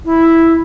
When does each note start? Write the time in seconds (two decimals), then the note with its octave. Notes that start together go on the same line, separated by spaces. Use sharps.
0.05 E4